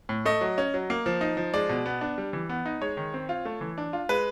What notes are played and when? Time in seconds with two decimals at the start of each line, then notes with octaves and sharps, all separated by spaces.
0.09 A2
0.25 A3 D#5
0.41 F#3
0.58 C#4
0.74 F#3
0.90 A#3
1.06 F3
1.21 D#4
1.37 F3
1.53 G#3 D5
1.69 B2
1.86 B3
2.01 D4
2.18 G3
2.33 E3
2.49 B3
2.66 D#4
2.81 G#3 C#5
2.97 D#3
3.14 C4
3.29 F4
3.45 A3
3.61 E3
3.78 D4
3.93 F4
4.09 G#3 B4